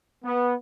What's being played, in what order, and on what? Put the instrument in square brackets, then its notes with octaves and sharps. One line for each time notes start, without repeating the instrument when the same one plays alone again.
[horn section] B3